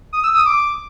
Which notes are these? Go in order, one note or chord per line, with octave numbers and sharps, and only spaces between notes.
D#6
E6
D#6
D6